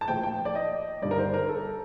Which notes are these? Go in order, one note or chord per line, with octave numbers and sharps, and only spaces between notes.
A5
A#1 A2 F3 G5
G5
D5
D#5
G1 G2 D#3 G3 D5
A#4
C5
A#4
A4